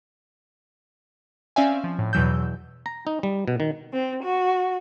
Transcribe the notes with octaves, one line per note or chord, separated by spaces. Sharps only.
C4 C#4 D5 E5 F5 G#5
F3
A2
E2 B2 E3 F#3 E6 G6
A#5
D#4
G3
B2
D#3
C4
F#4